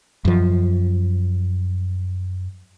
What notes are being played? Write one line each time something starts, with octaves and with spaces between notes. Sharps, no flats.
F#2 F3